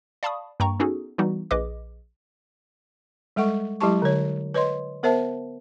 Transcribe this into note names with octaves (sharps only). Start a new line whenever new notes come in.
D5 F5 A5 B5 C#6 D#6
G2 A#3 G5 A#5 C#6
B3 C#4 D#4 F#4 G#4 A4
E3 G3 B3 D#4 F#4
A#1 G#4 B4 D#5 D6
G3 G#3 A4 F#5 C#6
F#3 G#3 E4 G4 A5 C#6
D3 C#5
B4 C#5 D#5 C6
B3 A#4 C5 E5 A5